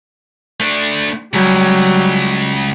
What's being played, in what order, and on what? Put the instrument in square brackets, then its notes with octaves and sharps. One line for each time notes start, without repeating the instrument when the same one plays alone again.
[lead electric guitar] A3 D4
[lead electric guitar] C#2 [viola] F#3 G3